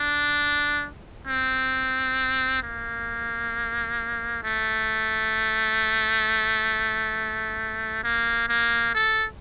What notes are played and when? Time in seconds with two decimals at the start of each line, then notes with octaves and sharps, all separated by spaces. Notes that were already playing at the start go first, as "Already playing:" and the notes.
Already playing: D4
1.27 C4
2.63 A#3
4.43 A3
8.04 A#3
8.49 A#3
8.95 A4